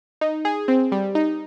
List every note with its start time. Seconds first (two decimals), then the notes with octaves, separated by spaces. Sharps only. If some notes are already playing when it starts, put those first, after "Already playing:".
0.21 D#4
0.45 G#4
0.68 C4
0.92 G3
1.15 D#4